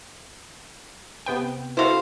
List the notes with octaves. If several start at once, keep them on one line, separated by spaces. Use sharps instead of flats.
C3 B3 G5
E4 F#4 A4 C5 F5